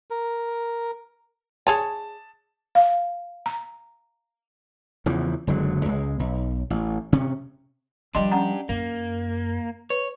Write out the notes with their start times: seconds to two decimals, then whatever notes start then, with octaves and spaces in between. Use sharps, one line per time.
0.10 A#4
1.67 G#4 C#5 G#5 A5
2.75 F5
3.46 A#5
5.06 E2 C#3 E3 F3
5.47 F#1 D3 F#3 G#3
5.85 C#2 G#3
6.19 B1
6.70 A1
7.13 C3 C#4
8.15 F3 G3 D4 G4 D#5 C6
8.31 C#4 F#5 A#5
8.69 F#2 A#3
9.90 B4 C#5